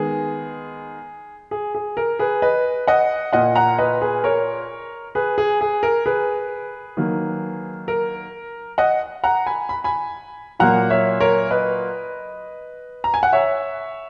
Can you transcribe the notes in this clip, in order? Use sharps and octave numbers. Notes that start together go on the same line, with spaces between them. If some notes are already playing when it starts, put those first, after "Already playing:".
Already playing: D#3 G#3 B3 G#4
G#4
G#4
A#4
G#4 B4
B4 D#5
D#5 F#5
A#2 A#3 D#5 F#5
F#5 A#5
B4 D#5
G#4 B4
A#4 C#5
G#4 B4
G#4
G#4
A#4
G#4 B4
D#3 F#3 A#3
A#4
D#5 F#5
F#5 A#5
G#5 B5
B5
G#5 B5
A#2 F#3 A#3 F#5 A#5
C#5 E5
A#4 C#5
B4 D#5
A#5
G#5
F#5
C#5 E5